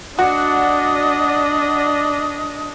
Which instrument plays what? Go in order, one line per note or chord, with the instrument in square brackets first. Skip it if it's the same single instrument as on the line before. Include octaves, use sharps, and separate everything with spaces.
[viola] D4 D#5 [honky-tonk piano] F#4 [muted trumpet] D5